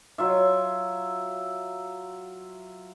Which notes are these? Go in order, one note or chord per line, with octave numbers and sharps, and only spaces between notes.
F#3 F4 E5